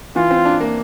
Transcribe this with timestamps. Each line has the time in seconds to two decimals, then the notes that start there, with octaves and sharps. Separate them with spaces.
0.16 E3 F4
0.31 C4
0.45 D4
0.60 A#3